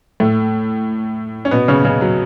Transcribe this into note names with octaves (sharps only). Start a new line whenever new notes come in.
A2 A3
C#4
B2 B3
C#3 C#4
C#3 C#4
F#3